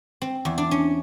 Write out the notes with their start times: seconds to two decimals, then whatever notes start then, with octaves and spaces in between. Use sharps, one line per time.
0.22 C4
0.45 E2
0.58 D4
0.71 C#4